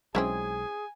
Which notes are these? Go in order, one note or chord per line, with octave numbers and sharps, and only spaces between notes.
B1 F#3 G#3 C4 C#4 E4 G#4 G#5